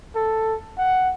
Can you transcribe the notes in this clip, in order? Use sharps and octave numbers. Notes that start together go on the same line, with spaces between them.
A4
F#5